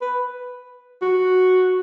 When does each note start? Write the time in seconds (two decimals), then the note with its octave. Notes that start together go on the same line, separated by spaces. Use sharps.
0.01 B4
1.02 F#4